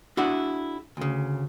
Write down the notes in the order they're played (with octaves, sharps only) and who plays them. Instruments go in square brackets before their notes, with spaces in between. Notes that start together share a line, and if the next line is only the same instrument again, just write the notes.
[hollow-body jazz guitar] D4 E4 F#4 G#4
D2 C#3